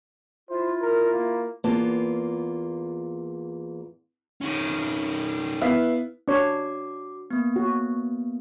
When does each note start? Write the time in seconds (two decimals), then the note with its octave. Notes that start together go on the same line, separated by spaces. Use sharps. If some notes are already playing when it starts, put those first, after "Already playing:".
0.49 E4 F4 C5
0.81 A#4
1.13 A#3
1.64 E2 A#3 B3 F4 A5
4.41 D#3 C#4
5.61 B3 E4 F5
6.28 D4 F#4 C#5 D6
7.30 A#3 B3
7.56 F#4